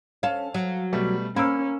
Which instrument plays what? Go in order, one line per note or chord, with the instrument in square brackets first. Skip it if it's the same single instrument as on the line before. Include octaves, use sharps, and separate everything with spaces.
[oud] C#4 A4 [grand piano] F5
[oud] F#3
[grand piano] B2 G3 A3
[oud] A#3 [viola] C#4 [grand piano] B5 E6